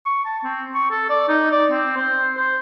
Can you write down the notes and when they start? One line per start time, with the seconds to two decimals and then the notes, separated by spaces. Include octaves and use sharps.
0.06 C#6
0.25 A5
0.44 C4
0.75 C#6
0.91 A4
1.10 D5
1.29 D#4
1.51 D5
1.71 C4
1.97 C5
2.37 C5